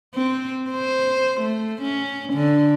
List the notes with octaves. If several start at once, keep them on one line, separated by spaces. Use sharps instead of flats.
C4
C5
A3
C#4
D3